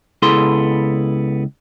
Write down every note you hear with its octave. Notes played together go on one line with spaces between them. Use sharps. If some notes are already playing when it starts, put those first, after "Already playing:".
C#2 B3 E4 G#4 A4 C6